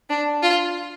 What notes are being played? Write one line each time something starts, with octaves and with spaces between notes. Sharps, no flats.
D4
F4